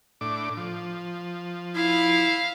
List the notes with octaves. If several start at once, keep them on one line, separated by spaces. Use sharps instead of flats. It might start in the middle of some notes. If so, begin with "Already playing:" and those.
A2 D4 D6
F3
E4 F5